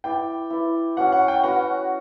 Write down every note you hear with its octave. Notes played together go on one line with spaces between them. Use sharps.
E4 B4 D5 G5
E4 B4 D5
C#4 F#4 B4 F#5
F#5
G5
C#4 F#4 B4 F#5